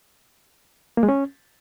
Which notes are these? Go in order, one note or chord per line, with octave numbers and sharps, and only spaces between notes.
A#3
G#3
C#4